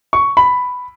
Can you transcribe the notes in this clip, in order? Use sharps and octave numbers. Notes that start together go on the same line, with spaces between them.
C#6
B5